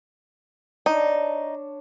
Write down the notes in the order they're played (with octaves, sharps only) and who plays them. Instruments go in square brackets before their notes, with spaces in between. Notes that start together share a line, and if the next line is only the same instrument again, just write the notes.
[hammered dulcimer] D4 C#5 A5 [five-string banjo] D#4